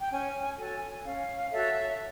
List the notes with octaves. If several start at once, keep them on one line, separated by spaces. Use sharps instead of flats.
G5
C#4 G#5
F#4 A4 C#5 G#5
C#4 F5
F#4 A4 C#5 E5